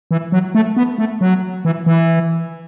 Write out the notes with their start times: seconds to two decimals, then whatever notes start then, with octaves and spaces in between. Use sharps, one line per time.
0.11 E3
0.32 F#3
0.55 A3
0.77 B3
0.98 A3
1.21 F#3
1.65 E3
1.86 E3